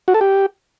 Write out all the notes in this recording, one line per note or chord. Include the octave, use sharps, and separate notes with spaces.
F#4
A4
G4